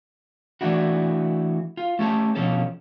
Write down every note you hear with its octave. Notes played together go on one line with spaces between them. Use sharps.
E3 A3 D4 E4 F#4
F4
A3 C#4 G4 A5
B2 D3 F3 C#4 A4